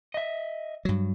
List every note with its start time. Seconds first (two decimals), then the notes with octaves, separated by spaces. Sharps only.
0.14 D#5 E5
0.85 G2 F#3